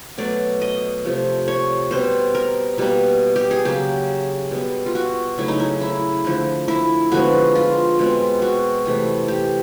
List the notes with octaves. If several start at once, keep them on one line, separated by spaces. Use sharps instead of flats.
B2 F#3 A3 D5
D#5
C3 F3 A3
C#5
B2 G3 C4 C5
A#4
B2 G3 A#3
G4
G#4
C#3 F#3 A#3 G4
B2 G3 B3
F4
F#4
C#3 F#3 A3 E4
D#4
E4
E4
D3 F3 A3
E4
D3 F3 G#3 B3 F#4
F4
B2 G#3 C4
F#4
C3 E3 A3
G4